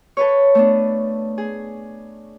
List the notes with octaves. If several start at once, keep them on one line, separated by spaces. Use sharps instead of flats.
A4 B4 C#5
A3 B3 D4
G#4